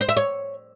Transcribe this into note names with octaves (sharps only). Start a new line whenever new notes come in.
C5
E5
C#5